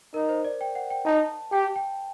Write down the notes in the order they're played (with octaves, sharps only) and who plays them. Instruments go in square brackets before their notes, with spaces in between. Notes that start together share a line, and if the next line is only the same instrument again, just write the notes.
[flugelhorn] D#4 [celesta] A#4
[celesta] C5
D5
G5
F#5
G5
[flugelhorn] D#4 [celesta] A5
[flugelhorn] G4 [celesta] G5
[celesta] G5